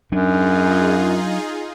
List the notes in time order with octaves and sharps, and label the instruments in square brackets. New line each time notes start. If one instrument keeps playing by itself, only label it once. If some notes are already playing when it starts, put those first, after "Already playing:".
[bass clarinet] F#2 [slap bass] F#3 D4 [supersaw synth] D#4 F4 G#4